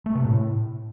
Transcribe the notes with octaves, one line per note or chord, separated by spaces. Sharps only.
A3
C3
A2